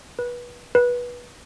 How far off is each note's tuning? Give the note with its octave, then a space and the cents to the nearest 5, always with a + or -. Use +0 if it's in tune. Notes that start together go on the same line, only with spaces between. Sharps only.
B4 -25
B4 -20